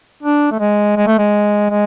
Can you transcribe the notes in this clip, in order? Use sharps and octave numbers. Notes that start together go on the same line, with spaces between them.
D4
A3
G#3
G#3
A3
G#3
G#3